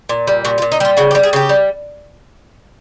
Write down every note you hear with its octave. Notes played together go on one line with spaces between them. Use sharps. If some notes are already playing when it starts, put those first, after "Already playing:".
A#2
G3
A#2 F#4
F4
A#2
D#4
G3 F4
C#3 F#4
G4
G3
G#4
C#3 G4
G3